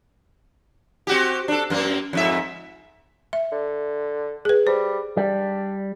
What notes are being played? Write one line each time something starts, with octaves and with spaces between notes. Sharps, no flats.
C4 F#4 G4
D4 A4
F#2 A#3 C4
F2 G#2 E5
E5
D3
G#4 B4
G3 C5
G3 D4